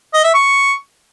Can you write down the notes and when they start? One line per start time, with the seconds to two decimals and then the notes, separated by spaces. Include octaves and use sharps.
0.14 D#5
0.24 E5
0.34 C#6